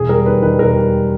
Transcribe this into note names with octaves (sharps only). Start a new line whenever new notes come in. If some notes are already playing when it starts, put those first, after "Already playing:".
Already playing: E1 G#4
G3 A#4
D#2 B4
D#3 B4
E1 A#4
G3